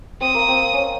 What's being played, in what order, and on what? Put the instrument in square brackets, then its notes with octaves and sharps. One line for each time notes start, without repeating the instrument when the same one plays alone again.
[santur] C4 [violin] D#6
[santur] A#3
C4
C#4